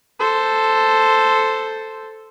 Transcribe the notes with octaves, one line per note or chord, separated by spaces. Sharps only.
A4 C5